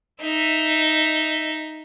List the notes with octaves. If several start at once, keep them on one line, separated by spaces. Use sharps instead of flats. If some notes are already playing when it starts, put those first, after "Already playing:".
D#4 E5